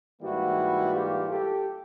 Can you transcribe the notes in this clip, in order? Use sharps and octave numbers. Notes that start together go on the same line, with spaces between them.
G#2 E3 G3 A#3 E4 F#4
F4 G4
G4 A4